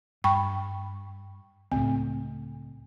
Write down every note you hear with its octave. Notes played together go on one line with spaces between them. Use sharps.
G2 G5 B5 C#6
C#2 A2 C4